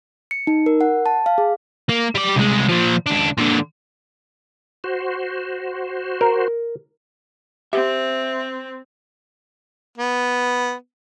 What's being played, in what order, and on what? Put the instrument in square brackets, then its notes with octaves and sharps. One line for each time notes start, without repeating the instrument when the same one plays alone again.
[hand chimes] C#7
D#4
A#4
F#5
A5
F5
G#4
[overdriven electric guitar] A#3
G3 D5
C2 G#3
A#2 F3
C#2 D4
A#2 D3
[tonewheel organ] F#4 C5
[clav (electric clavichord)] A#4
[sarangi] C4 [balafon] G4 [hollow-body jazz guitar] E5
[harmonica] B3